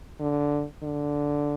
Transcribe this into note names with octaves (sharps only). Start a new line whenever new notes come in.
D3
D3